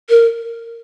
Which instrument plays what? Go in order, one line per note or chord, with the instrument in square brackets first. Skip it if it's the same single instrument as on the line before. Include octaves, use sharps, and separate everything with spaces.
[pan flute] A#4